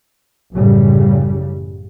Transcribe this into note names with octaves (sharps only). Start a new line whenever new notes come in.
A1 F#2 A2 C#3 G3